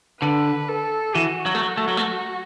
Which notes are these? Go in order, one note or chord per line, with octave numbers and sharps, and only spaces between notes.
D3 B4
A4
E3 F#4
F#3
A3
F#3
A3
F#3
A3